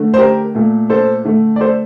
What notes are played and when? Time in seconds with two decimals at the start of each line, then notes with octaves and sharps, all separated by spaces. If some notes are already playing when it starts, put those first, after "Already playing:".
Already playing: D3 A3
0.14 C5
0.18 G4 A#4
0.55 A#2 A3
0.90 A4 C5
1.25 D3 A3
1.56 D5
1.61 A4 C5